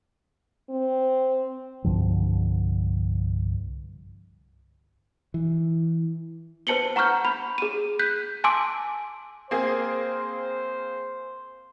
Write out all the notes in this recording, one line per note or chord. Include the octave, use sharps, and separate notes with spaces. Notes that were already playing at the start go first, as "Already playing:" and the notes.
C4
C2 G2 D3 F3
E3
B4 C5 A5 C#7 F#7 G7
F#5 A#5 C#6 F6 G6
B5
G#4 D#7
F#6 G6 B6
G#5 A5 C6 D6 E6 D7
A#3 C4 G#4 C5